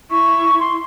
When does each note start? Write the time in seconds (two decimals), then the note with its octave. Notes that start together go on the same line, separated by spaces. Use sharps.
0.11 E4 C#6
0.60 C6